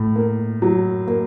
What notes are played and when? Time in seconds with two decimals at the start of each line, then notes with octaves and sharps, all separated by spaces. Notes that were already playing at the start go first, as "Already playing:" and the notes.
Already playing: A2
0.16 A#3
0.62 F#3
1.07 A#3